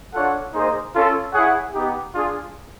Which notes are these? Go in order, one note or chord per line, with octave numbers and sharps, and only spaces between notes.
D4 F4 A4 C#5 F#5
A#3 D#4 G#4 C5 D#5
C#4 F4 A4
E4 G#4 C#5 F#5
B3 D#4 G4
D4 F4 G#4